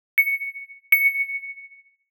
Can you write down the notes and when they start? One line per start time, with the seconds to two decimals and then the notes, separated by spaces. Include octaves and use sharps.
0.18 C#7
0.92 C#7